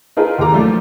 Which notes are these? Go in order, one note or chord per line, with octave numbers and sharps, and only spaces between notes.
D#4 F4 G#4 A#4 B4
D#2 E4 G4 A#5 D6
F3 F#3 A3 A#3 D4